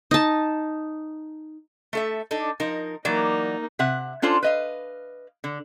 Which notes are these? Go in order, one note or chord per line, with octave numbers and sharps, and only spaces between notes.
D#4 A5
A3 A4 E5
D4 D#4 A4
F3 D#4 A#4
E3 F#3 A#3 D#4 D5
C3 E5 F#5
C#4 D4 F4 A4 C5
B4 D#5 F5
D3